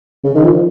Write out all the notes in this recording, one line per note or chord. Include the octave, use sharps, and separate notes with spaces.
C#3
D#3
F3